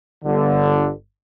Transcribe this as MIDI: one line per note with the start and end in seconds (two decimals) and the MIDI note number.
0.25 0.90 31
0.25 0.90 50